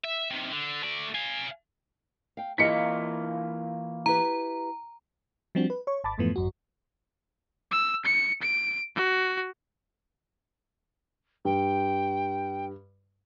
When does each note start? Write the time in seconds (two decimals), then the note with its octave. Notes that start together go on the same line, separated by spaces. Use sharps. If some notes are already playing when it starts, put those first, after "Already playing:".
0.04 E5
0.31 C3 D#3
0.52 D3
0.83 A3 D5
1.14 F5 G#5
2.37 F5 G5
2.58 E3 A#3 E4 F4 D#5 F5 B6 C#7
4.06 E4 G4 B4 A#5
5.55 F3 G3 C4 D4 F#4
5.70 B4
5.87 C#5 C#6
6.04 G#1 A5 B5 D6 A6
6.18 F2 G#2 E3 F3 A3 B3
6.36 G#1 F#2 F#4
7.71 E6
8.05 C#7
8.41 D7
8.96 F#4
11.45 G2 G5